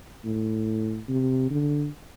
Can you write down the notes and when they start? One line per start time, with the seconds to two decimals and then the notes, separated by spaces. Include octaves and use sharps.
0.25 A2
1.09 C3
1.50 D3